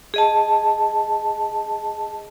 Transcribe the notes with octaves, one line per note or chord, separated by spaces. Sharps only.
G#4 D#5 A5